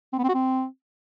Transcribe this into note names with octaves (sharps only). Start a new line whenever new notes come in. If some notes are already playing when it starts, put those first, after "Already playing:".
C4
B3
C4
F#4
C4